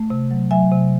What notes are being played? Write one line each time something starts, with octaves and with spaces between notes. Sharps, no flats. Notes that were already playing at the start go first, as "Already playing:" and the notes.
Already playing: A3
C3
F#3
F#3 E5 G#5
C3